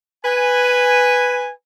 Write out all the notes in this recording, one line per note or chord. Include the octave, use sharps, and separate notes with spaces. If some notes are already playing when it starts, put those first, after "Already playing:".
B4 G#5